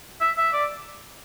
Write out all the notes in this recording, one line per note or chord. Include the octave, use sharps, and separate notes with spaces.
E5
E5
D5